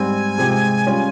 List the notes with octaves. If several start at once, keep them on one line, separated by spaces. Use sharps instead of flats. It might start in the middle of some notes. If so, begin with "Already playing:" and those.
Already playing: G#2 G3 C4 G#5
C3 F3 G#3 C4 G4
G3 C#4 F4